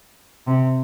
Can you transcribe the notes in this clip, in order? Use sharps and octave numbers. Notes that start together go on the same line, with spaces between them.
C3